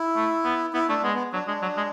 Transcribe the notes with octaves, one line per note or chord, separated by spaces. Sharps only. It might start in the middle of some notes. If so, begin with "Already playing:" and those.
Already playing: E4
A3
B3
B3 E4
A3 D4
G#3 B3
B3
F#3 D4
G#3 D4
F#3
G#3